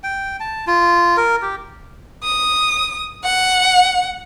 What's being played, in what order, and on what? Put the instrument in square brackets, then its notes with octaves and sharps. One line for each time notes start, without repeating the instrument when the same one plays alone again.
[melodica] G5
A5
F4
A#4
G4
[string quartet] D#6
F#5